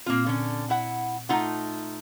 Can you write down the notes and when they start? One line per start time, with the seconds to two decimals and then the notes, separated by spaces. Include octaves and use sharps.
0.06 A#2 A#3 C4 F4
0.26 D3 C#4
0.70 E4 F#5
1.29 A3 D#4 F4 F#5 A#5